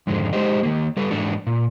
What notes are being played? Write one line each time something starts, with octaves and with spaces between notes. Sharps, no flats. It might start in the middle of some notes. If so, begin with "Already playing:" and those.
F2 G#2 D3 D#3 G#3
G#3 D#4 G4 C5 D#5
D#3 A#3
G3 A4 B4
G#2 E3 D4 F#4
A#2